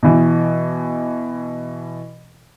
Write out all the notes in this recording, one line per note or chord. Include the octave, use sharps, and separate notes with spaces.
B2 E3